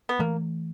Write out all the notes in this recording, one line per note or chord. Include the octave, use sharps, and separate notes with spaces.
B3
E3 A3 A#3